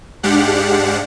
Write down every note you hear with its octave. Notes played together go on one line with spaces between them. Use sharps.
G#2 G#3 D4 G4 F5 F#5